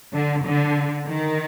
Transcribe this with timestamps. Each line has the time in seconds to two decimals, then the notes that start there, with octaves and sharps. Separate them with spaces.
0.13 D3
0.45 D3
1.07 D#3